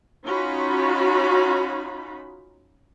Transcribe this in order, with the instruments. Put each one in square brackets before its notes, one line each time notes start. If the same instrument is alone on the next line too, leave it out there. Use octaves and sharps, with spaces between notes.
[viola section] C#4 D#4 F4 F#4 B5